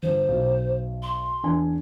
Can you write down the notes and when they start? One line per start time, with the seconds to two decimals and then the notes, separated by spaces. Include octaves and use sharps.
0.03 G1 C5
0.28 B1
1.03 C6
1.43 E2 D4 G#5